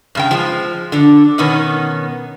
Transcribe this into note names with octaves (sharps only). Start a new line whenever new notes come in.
G2 C#3 G5
F3 G#3
D3 D4
B2 D#3 B3 C#4